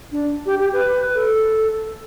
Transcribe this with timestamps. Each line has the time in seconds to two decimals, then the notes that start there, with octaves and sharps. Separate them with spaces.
0.12 D4
0.46 G4
0.59 G4
0.73 B4
1.15 A4